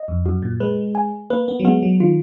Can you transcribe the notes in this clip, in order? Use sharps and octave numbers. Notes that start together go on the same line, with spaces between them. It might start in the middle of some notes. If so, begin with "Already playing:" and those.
Already playing: D#5
F2
F#2 F#4
A#2
G#3 B4
G#5
A#3 B4
B3
F#3
G#3 B3
F#3
D#3 F4